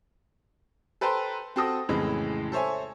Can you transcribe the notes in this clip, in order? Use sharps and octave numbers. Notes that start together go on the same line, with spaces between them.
A4 B4 C5 G5 A#5 C6
C4 F#4 A4 G5 D#6 A#6
F2 A2 C#3 E3 G#3
A4 C5 C#5 E5 G#5